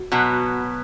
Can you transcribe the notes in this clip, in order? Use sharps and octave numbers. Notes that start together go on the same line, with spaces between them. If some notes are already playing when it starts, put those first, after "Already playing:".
Already playing: F#4
B2 F#3 B3